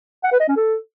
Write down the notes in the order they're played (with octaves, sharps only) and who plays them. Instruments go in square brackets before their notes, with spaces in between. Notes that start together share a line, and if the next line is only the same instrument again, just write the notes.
[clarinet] F#5
B4
D#5
C#4
A4